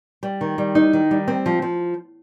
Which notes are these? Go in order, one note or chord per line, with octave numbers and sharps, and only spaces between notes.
G3
D#3
G3
D#4
D#3
G3
C4
F3
F3